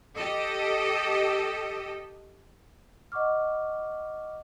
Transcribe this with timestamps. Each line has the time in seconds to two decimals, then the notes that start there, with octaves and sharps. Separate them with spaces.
0.17 G4 A4 D#5
3.12 D#5 F#5 C#6 D6 F6